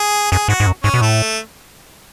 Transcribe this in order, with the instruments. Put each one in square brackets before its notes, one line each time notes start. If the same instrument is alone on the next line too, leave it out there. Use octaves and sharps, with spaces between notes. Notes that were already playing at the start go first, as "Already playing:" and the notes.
Already playing: [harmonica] G#4
[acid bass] F#2 [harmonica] G#4
[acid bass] G#2 [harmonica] F#4
[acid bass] G#2
F#2
[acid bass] G#2 [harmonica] C#4
[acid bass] B2
[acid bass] A2 [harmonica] A3